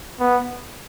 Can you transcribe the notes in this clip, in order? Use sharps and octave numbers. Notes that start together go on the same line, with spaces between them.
B3